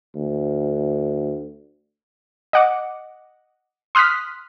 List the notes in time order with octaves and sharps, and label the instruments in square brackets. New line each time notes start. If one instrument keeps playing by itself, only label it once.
[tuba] D2
[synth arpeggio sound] D#5 F#5 D6
C6 D#6 F6 F#6 B6